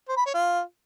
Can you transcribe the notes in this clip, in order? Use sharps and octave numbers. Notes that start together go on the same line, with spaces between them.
C5
B5
C#5
F4